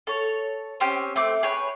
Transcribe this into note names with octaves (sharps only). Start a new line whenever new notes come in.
A4 C#5
C4 C#4 G4 G#5
A3 C4 D6
G#4 B4 C#5 G5